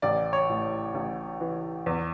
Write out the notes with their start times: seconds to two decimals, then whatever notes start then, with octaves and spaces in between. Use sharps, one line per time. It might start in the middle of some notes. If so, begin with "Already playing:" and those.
0.02 A1 D5
0.33 C#5
0.49 A2
0.95 A1
1.41 E3
1.86 E2